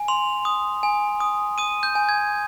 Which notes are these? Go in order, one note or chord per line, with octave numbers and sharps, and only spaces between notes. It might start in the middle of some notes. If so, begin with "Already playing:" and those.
Already playing: G#5
C6 F7
D#6
G#5
D#6
D#6 D#7
G6
G#5
G#6